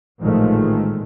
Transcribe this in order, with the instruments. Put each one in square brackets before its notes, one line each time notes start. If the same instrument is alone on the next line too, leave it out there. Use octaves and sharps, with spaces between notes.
[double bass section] A1 A#2 D#3 F3 G#3 A3